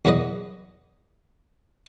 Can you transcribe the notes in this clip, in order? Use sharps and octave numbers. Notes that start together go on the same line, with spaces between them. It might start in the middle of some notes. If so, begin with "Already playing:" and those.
E2 F#3 E4 B4 D#5 D#6